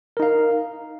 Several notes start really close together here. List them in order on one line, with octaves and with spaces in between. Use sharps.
A#4 D#4 F5